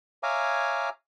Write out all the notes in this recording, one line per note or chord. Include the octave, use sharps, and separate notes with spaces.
C#5 E5 F5 G#5 A#5 D6